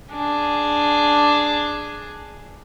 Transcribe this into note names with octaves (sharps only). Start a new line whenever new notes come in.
D4 G#4